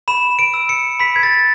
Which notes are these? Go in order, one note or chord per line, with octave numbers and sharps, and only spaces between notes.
B5 E7
D7
E6
C#7
B5 B6
G#6
A6